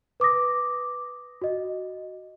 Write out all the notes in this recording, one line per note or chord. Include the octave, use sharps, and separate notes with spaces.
B4 D6 D#6 A#6
F#4 D#5